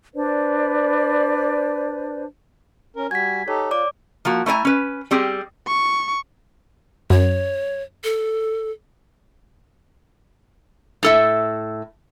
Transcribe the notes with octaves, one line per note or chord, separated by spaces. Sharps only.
D4 B4 C5 D5
C#4 A#4
G3 F#4 G#5 G#6 B6
D#4 G4 A4 C#5
F4 D5 D6
F3 A#3 F#4
A3 E4 C#5 G#5 A#5
C#4 B4
G3 C4 G4 G#4
C#6
F#2 C#5
A4
A2 A4 E5